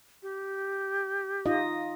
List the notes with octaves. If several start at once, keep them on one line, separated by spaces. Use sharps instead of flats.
G4
D#4 F4 D#5